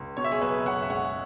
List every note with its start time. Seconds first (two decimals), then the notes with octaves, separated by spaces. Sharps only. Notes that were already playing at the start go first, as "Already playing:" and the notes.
Already playing: C#2
0.17 B2 C#5
0.24 E5
0.31 G#4 C#5
0.41 B1 B4 E5
0.66 F#1 C#5 F#5
0.82 E5
0.90 G#3 C#5 F#5